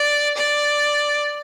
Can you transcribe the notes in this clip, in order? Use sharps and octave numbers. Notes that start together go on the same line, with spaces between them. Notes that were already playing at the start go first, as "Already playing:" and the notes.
Already playing: D5
D5